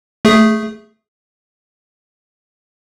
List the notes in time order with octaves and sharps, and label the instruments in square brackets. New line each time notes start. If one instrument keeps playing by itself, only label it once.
[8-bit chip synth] A3 G#4